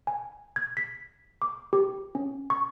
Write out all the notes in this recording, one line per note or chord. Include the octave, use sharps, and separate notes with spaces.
G#5
G#6
B6
D6
G4
C#4
C#6